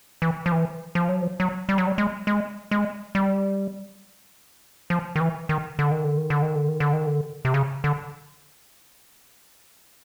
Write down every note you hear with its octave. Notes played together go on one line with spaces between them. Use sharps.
E3
F3
E3
F3
F#3
F3
F#3
G3
F#3
G3
G#3
G#3
G#3
G3
F3
D#3
E3
D#3
D3
D#3
D3
D#3
D3
D#3
D3
D#3
D3
D#3
D3
C3
C#3
D3